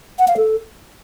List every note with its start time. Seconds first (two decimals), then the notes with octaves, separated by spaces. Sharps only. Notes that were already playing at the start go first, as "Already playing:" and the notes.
0.19 F#5
0.28 F5
0.37 A4